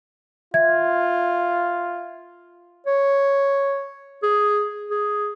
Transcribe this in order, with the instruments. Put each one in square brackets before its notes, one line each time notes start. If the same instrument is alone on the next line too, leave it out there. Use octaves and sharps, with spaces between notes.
[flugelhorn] F4 [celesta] E5 G#6
[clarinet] C#5
G#4
G#4